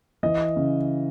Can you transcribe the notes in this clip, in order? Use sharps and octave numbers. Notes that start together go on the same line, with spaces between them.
E3 D#5
C#3